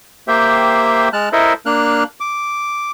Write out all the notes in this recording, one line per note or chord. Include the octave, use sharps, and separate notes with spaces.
A#3 G4 C5 E5 G5
G#3 A5 F6 F#6
E4 A4 A#4 C5 D#5 E5
A#3 D4 F6 F#6
D6